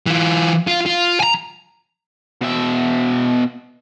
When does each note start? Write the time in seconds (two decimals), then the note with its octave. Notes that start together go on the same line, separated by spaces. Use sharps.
0.06 E3 F4
0.67 F4
0.86 F4
1.20 G#5 A#5
2.41 B2 E5